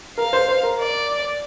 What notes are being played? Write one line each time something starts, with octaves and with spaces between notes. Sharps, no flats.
A#4 F5
C5
C5
A#4
D5